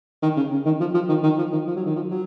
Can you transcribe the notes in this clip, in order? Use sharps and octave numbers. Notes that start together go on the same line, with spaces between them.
D#3
C#3
C#3
D#3
F3
F3
D#3
D#3
F3
D#3
F3
F#3
D#3
F3
F#3